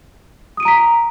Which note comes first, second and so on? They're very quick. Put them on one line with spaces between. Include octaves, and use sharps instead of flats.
D#6 D#7 D7 A#5 B6